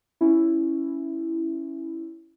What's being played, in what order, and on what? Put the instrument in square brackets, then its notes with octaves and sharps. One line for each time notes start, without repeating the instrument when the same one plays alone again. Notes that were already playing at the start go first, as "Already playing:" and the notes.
[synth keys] C#4 E4